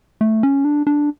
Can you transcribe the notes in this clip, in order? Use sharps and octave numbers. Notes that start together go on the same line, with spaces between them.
A3
C#4
D4
D4